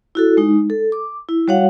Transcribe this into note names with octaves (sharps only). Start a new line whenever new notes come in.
E4 F#4 A4
G#3 D#4
A4
D6
E4
G3 F#4 C#5 F5 F#5